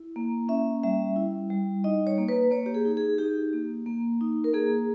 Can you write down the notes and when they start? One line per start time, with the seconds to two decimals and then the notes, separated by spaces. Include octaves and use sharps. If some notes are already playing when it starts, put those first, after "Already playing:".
Already playing: E4
0.16 A#3
0.49 C#4 E5
0.83 G3 E5
1.16 E4
1.50 G3
1.84 D#4 D#5
2.07 C#5
2.18 A#3
2.29 B4
2.51 A#3 C#5
2.66 G4
2.74 G#4
2.85 D#4
2.97 G#4
3.18 D#4 G4
3.53 A#3
3.86 A#3
4.21 D#4
4.44 A#4
4.54 A#3 G#4